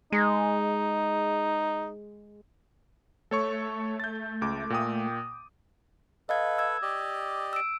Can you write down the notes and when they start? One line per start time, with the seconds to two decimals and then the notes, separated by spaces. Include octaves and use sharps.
0.12 G#3 D#4
3.31 A3 A4 C#5 C#6
4.00 G6 A6
4.42 C#2 D6
4.70 A#2 G5 D#6
6.29 A4 B4 D#5 F5 G#6
6.58 E6 G#6
6.82 G4 D5 D#5
7.53 E6 D7